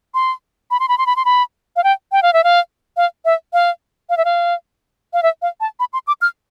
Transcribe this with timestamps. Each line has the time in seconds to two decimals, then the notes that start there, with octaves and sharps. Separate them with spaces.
0.14 C6
0.71 B5
0.80 C6
0.88 B5
0.98 C6
1.06 B5
1.16 C6
1.25 B5
1.76 F5
1.84 G5
2.12 G5
2.22 F5
2.33 E5
2.44 F5
2.97 F5
3.25 E5
3.53 F5
4.10 F5
4.17 E5
4.25 F5
5.13 F5
5.23 E5
5.42 F5
5.61 A5
5.80 B5
5.93 C6
6.07 D6
6.22 F6